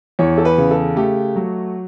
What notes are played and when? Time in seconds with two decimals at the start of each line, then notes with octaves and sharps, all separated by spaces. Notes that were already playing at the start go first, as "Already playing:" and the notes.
0.19 E2 C#5
0.38 A4
0.45 B4
0.58 C#3
0.71 A4
0.96 A3 G4
1.36 F#3 F#4